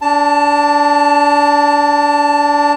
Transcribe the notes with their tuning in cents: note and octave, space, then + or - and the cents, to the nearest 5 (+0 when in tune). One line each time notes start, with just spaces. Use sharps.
D4 -25 A5 +15